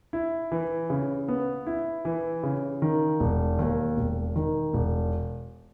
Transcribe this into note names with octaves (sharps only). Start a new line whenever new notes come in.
E4
E3
C#3
B3
E4
E3
C#3
D#3
E1
D#2
E1
D#3
E1